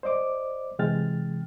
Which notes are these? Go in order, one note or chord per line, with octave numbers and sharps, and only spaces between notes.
C5 D5 D#5 D6
C3 E3 G#3 G5 F6 A6